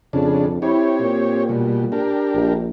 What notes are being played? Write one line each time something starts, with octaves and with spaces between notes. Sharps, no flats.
F2 C#3 D4
C4 E4 G4 C#5
A#2
B2 G3
D4 G4 A#4
A#1